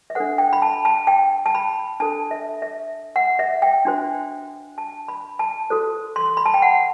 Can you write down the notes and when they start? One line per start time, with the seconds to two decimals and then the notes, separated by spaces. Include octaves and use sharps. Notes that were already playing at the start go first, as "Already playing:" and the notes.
0.10 E5
0.15 D4 A4 C5 F#5
0.38 G5
0.53 B5
0.62 A5
0.85 A5
1.07 G5
1.46 A5
1.55 B5
2.00 D4 A4 C5 A5
2.31 E5
2.62 E5
3.16 F#5
3.39 E5
3.62 G5
3.85 D4 F#4 C5
4.78 A5
5.08 B5
5.39 A5
5.70 F#4 A4 C5
6.16 C6
6.37 B5
6.46 A5
6.54 G5
6.62 F#5